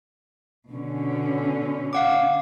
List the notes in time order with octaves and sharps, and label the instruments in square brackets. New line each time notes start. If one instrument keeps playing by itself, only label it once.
[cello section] B2 D3 C#4
[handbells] F5 F#5 D6